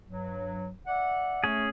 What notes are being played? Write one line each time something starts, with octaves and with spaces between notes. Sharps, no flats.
G2 F#3
D5 E5 F#5
A3 C#4 G#4